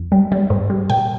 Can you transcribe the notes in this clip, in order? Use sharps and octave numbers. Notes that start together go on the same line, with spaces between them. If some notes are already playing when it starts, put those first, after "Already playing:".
Already playing: F2
G3
G3
G#2
G3
A#2 G5